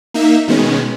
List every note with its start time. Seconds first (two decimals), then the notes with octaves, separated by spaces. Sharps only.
0.14 A#3 D#4 E5
0.48 B2 D#3 G#3 B3 C#4